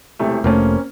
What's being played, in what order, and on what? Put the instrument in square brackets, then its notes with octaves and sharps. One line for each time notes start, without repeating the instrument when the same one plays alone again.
[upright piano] E1 C3 A3
[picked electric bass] F1 A3 [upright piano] A#3 C4 C#4